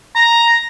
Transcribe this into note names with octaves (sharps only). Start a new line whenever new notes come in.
A#5